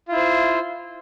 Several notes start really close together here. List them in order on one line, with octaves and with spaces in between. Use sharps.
F4 E4 C5